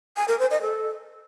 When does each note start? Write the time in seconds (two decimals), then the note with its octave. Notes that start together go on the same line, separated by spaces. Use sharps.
0.17 G#5
0.28 A#4
0.39 C5
0.51 D#5
0.62 A4